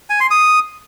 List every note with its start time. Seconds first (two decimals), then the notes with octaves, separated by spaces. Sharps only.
0.10 G#5
0.20 C6
0.31 D#6